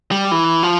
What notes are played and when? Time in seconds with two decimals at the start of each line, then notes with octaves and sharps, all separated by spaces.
0.11 G3
0.32 E3
0.63 F3